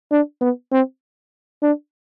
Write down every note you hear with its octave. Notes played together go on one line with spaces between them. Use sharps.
D4
B3
C4
D4